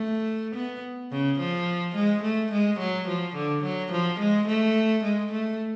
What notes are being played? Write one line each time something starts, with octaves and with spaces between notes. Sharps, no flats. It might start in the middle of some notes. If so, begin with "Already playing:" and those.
Already playing: A3
B3
C#3
F3
G#3
A3
G#3
F#3
F3
D3
F#3
F3
G#3
A3
G#3
A3